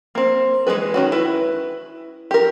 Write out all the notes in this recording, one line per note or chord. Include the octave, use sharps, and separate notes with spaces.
A#3 C4
E3 G#3 C#4 G#4 B4
D#3 C#4 F#4
E4 B4
G4 A#4